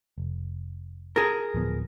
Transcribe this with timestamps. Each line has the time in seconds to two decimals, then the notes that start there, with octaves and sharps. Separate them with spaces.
0.18 F1
1.16 G#4 A#4
1.54 D1 F3 B3